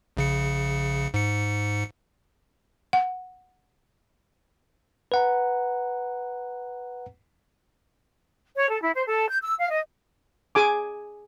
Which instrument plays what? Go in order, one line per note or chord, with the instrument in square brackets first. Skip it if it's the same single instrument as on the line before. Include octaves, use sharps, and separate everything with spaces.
[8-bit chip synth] A#1 C#3 C#7
G#2 C#7
[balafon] F#5
[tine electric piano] B4 F#5 A#5
[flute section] C#5
A4
E4
C5
A4
G6
E6
F5
D#5
[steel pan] G#4 G#5 D6